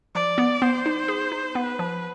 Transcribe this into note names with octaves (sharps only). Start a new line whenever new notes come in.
F3 D5
B3
B3 C5
D#4
G#4
D#4
B3 B4
F3